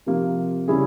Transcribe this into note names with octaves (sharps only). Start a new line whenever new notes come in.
C3 F3 A#3 F4
C#3 G3 C#4 E4 G#4